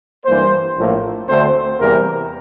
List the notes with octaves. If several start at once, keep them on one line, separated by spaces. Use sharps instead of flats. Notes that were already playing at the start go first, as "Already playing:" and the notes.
G2 E3 G3 A#3 C5
A#1 A2 F3 A#3
D2 D3 A3 C4 C5
E2 C3 G3 A#3 A#4